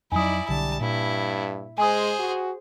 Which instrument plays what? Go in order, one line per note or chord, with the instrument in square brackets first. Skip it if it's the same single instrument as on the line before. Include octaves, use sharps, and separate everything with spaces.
[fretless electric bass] F2 F#3 [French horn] D#4 [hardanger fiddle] E4 D5 [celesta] G#5 D#6
[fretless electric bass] B1 D3 [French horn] G3 [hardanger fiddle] A5
[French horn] G2 [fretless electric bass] A#2 [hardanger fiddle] E4
[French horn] G#3 [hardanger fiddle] G#4 C5 [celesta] G#5 D#6
[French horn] F#4